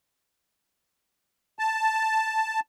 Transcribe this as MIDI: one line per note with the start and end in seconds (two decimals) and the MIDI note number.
1.59 2.60 81